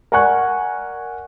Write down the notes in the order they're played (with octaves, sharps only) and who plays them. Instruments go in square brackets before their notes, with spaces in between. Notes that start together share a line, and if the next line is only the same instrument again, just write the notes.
[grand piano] A#4 D5 F#5 G#5 C#6 F#6